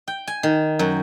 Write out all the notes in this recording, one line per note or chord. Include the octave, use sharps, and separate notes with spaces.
G5
G#5
D#3
F#2